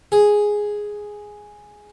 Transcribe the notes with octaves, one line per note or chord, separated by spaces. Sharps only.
G#4